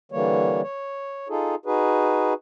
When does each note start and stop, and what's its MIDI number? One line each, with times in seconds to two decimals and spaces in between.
0.12 0.62 50
0.12 0.62 52
0.12 0.62 55
0.12 0.62 58
0.12 0.62 73
0.63 1.28 73
1.29 1.55 63
1.29 1.55 65
1.29 1.55 68
1.29 1.55 69
1.66 2.34 63
1.66 2.34 66
1.66 2.34 68
1.66 2.34 71